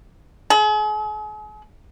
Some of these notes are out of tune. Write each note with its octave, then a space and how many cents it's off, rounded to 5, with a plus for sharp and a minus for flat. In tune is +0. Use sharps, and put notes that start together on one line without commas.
G#4 +40